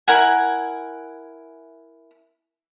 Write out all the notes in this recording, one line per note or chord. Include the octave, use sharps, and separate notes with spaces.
E4 A#4 F#5 G#5